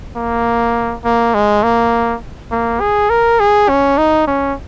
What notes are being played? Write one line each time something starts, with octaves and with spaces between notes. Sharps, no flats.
A#3
A#3
G#3
A#3
A#3
G#4
A#4
G#4
C#4
D#4
C#4